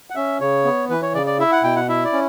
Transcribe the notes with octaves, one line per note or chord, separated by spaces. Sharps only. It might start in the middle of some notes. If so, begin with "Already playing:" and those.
F#5
C#4 E5
C#3 C#5
B3
E3 B4
C#5
C#3 D5
D5
E4 E5
F#5
B2 G5
F#5
E4 E5
D5
C#4